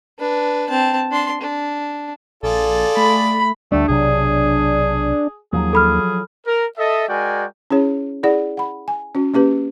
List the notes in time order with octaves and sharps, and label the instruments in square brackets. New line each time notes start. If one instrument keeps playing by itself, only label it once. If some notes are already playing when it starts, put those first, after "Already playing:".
[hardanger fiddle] D4 B4
C4 A5
D4 C6
D4
[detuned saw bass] A#1 [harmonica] F4 G#4 D5 [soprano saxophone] A4
[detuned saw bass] A3 [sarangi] B5
[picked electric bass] D2 G3 [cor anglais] A3 [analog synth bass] D4
[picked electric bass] B1 C3 F#3 [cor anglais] G#4
[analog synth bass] D#2 [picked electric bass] F3 F#3 [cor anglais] G#4
[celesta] A4 B5 F6
[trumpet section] A#4
A4 D#5 E5
G#3 F#4 A#4 D5 G5 G#5
[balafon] C#4 E4 G#4 C#5
E4 G#4 D5 F#5
F#5 B5
G#5
C#4 F#4
A#3 C#4 G4 B4